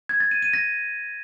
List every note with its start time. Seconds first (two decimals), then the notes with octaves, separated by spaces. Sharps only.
0.09 G#6
0.20 A6
0.31 D#7
0.42 D#7
0.53 A#6